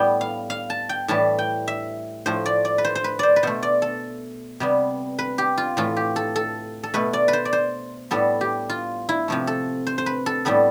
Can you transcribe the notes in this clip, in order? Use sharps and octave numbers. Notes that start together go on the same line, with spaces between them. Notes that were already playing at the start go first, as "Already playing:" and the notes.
Already playing: A2 G3 B3 G5
F5
F5
A5
G5
A2 E3 G3 A5
G5
E5
A2 F3 A3 C5
D5
D5
B4
C5
C5
B4
C5 D5
B4
B2 A3 C5
D5
A4
C3 G3 B3
B4
G4
F4
A2 E3 A3 F4
G4
A4
A4
A4
B2 A3 B4
D5
B4
C5
D5
C5
A2 G3 B3 A4
G4
F4
E4
C3 F3 A3
A4
C5
C5
B4
A4
A2 G3 B3 A4